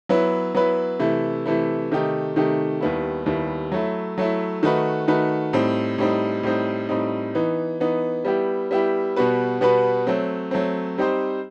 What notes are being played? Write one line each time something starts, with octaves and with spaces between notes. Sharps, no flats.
F#3 B3 E4 B4
F#3 B3 E4 B4
C3 E3 A3 E4
C3 E3 A3 E4
C3 D#3 A3 D#4 G4
C3 D#3 A3 D#4 G4
D#2 D#3 G3 B3 E4
D#2 D#3 G3 B3 E4
F#3 A3 E4
F#3 A3 E4
D#3 A3 D#4 F#4 B4
D#3 A3 D#4 F#4 B4
A2 G3 C4 D#4
A2 G3 C4 D#4
A2 G3 C4 D#4
A2 G3 C4 D#4
E3 B3 D#4
E3 B3 D#4
G3 B3 E4 G4
G3 B3 E4 G4
B2 G3 B3 F#4 B4
B2 G3 B3 F#4 B4
F#3 A3 C4
F#3 A3 C4
G3 C4 D#4 G4 C5